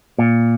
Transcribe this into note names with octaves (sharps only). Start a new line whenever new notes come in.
A#2